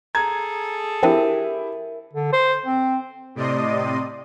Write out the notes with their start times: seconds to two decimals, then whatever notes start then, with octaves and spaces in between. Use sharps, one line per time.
0.15 G#4 A4 A#5 G#6
1.03 F3 C4 D4 E4 G4 A#4 E5 D#7
2.13 D3
2.33 C5
2.66 C4
3.35 A2 C3 D5 D#5 C6 D#6